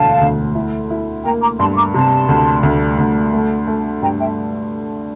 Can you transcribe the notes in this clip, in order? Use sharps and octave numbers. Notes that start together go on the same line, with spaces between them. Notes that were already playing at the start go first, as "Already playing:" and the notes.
Already playing: E1 D2 D3 F5 A5
D2
E4
E4
A#3 G5 A#5
A#5 D6
G2 A5 C6
C6
A#5 D6
C3 A5 C6
D2
D2
D2
A3
A3
G2 G5 A#5
E5 G5